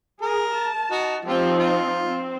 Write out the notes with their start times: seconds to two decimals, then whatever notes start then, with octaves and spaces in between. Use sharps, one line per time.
0.22 G#4 A#4
0.55 A5
0.91 D#4 F#4
1.25 F3 C4 D#4 F4 G4
1.59 F4
2.06 C4